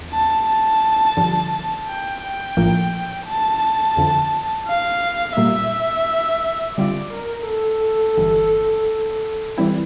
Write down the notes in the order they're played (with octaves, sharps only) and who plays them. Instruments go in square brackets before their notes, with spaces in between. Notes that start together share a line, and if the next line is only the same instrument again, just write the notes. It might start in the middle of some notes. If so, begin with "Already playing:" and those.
Already playing: [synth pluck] E2
[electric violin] A5
A5
[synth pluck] G2 D3 F3
[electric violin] G5
G5
[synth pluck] A#1 A2 F3 A#3
[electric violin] A5
[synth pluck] F2 D3 F3
[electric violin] F5
[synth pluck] A#2 G3 A#3 [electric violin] E5
[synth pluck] D3 G3 C4 F4 [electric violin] D5
[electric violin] A#4
A4
[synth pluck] G1 G2 E3
E3 G3 C4 E4